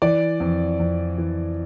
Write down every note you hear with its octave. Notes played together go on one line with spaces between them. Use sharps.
E3 D5
F2
F2
E3